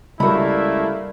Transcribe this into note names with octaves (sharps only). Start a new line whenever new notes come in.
C#2 G3 A3 A#3 E4 F#4 A#4 B5